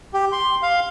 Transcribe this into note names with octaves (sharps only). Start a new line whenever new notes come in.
G4
C6
F5